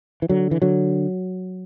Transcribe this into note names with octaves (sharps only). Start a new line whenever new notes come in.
E3
D3 F#3
E3
D3 F#3